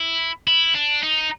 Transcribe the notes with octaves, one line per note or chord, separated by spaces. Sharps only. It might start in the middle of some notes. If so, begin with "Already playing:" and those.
Already playing: E4
E4
D4
D#4